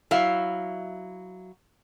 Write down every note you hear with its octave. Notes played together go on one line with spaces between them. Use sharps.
F#3 E4 E5 F5